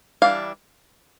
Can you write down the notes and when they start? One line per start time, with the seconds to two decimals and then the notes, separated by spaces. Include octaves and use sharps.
0.22 E3 G3 D4 F5